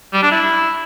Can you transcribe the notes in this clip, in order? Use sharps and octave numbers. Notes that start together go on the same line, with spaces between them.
G3
D4
E4